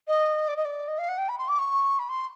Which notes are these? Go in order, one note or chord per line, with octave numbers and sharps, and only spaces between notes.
D#5
D5
D#5
D5
D#5
F5
F#5
G5
B5
C6
D6
C#6
B5
C6